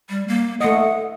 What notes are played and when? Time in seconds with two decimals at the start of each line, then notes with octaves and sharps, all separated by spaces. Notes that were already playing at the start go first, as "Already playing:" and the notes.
0.10 G3
0.28 A#3
0.61 A3 D#5 F#5